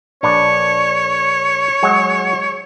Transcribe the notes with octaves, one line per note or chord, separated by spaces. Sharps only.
A#1 D4 B4 C#5
F#3 G#3 F#4